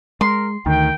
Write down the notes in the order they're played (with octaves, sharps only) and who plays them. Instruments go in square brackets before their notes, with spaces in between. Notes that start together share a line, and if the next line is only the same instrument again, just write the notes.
[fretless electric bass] G#3 [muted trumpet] A#4 [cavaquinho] C6
[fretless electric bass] D2 [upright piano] D#3 [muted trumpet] G5